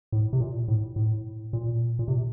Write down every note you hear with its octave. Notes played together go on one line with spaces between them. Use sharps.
A2
C3
A#2
A2
A2
A#2
A#2
C3